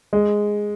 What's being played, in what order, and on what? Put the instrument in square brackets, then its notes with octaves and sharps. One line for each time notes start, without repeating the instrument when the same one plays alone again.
[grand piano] G#3